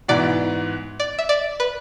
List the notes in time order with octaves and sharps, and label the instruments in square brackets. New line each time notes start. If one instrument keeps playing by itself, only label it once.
[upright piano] G#2 E3 B3 F#4 [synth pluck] D5
[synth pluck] D5
E5
D5
B4